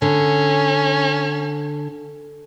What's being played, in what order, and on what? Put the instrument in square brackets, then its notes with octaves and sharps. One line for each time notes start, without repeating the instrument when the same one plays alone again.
[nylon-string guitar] D3 [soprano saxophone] C#4